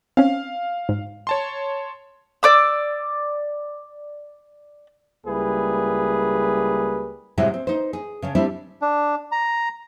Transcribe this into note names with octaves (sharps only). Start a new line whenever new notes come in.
C4 C#4 F5
G#2
C#5 A5 C6
D5 D6 E6
C#2 G3 A#3 E4 G#4 B4
A2 C3 G3 G#3 E4 F#4
C4
D#4 C5
G#4
C#3 C#4 D4
G3 C4 D4 E4
D4
A#5